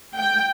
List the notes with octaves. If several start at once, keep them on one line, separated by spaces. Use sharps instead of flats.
G5